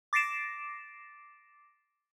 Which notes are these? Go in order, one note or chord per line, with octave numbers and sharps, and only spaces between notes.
D6 A6 A#6 C7 D7 E7